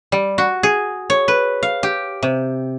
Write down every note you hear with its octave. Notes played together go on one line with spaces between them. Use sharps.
G3
F#4
G#4
C#5
B4
F5
G4
C3